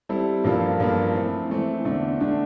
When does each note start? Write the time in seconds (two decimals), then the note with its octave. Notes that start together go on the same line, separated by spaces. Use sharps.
0.09 G3 C4 E4 A4
0.44 G2 F3 A#3 F4 A4
0.80 G2 F3 A#3 F4 A4
1.15 E3 A3 C4
1.50 E3 A3 C4
1.85 E2 D3 A3 D4
2.20 D3 A3 D4